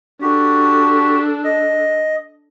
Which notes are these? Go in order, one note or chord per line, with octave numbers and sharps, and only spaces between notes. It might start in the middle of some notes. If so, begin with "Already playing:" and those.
D4 F#4 G4 A4
D#5